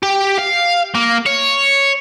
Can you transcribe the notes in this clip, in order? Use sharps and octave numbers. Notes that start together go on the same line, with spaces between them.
G4
F5
A#3
C#5